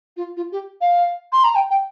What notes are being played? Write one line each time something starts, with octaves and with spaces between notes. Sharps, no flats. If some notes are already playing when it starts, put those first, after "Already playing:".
F4
F4
G4
F5
C6
A#5
G5
G5